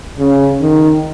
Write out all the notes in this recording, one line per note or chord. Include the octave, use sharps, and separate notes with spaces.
C#3
D#3